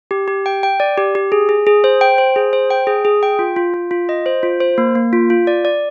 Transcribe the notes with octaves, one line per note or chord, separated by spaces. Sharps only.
G4
G4
G5
G5
D5
G4
G4
G#4
G#4
G#4
C5
G5
C5
G#4
C5
G5
G#4
G#4
G5
F4
F4
F4
F4
D#5
C5
F4
C5
A#3
A#3
F4
F4
D5
D5